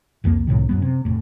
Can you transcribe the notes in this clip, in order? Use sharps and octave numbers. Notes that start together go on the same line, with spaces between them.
C2 F2 F3 A#3
C2 A2 C3 D#3
F#2 F#3 B3
C3
F1 A2